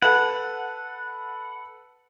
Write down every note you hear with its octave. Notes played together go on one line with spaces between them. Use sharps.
A4 B4 F#5